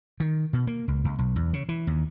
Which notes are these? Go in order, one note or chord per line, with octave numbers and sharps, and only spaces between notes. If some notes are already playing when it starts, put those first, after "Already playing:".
D#3
B2
A#3
C#2
C#2
B1
E2
C#3
E3
D#2